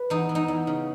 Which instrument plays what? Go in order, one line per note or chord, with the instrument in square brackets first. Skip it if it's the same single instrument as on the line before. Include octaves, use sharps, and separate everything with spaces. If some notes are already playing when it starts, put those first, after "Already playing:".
Already playing: [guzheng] B4
E2 D#4
E3
D#4
E2
C#3